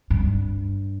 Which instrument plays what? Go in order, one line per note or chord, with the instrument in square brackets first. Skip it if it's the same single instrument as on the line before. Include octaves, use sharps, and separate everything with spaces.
[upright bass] G2